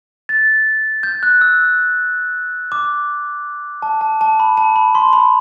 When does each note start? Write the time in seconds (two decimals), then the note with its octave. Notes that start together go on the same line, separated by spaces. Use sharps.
0.29 A6
1.03 G6
1.23 F#6
1.41 E6
2.72 D6
3.82 A5
4.01 A5
4.21 A5
4.40 B5
4.57 A5
4.76 B5
4.95 C6
5.13 B5